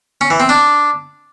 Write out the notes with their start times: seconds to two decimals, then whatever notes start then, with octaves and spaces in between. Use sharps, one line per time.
0.21 C#4
0.30 E3
0.40 C4
0.49 D4